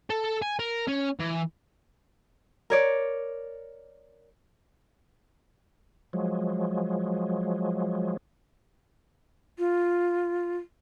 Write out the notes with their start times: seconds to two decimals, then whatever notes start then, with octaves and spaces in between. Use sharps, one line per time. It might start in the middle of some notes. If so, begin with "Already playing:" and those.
0.10 A4
0.42 G#5
0.59 A#4
0.88 C#4
1.19 E3
2.70 A#4 C#5 D5
6.13 F3 F#3 G#3
9.59 F4